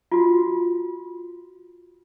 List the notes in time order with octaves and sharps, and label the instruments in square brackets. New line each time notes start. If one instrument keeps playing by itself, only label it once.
[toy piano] F4 F#4